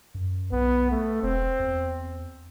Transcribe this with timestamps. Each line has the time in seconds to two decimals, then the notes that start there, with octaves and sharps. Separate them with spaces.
0.14 F#2
0.52 B1 B3
0.91 A3
1.22 E1 C4
1.60 E2